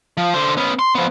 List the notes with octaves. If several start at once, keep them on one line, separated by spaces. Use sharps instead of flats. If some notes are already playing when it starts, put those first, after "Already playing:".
F3
D3 C5
B3 C#4
C6
F3 B3